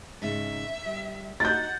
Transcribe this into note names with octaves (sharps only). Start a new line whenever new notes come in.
G#2 C#3 E5
G3
D#4 F#4 F#5 G6 A6